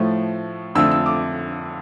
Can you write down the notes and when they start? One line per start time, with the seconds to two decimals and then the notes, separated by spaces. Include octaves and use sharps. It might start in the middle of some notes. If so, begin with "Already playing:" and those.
Already playing: A2 F3 A3
0.75 F2 D3 A3 E6
0.91 E6
1.06 D6